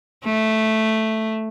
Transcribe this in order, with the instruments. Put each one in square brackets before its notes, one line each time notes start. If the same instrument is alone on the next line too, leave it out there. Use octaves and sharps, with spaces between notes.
[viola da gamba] A3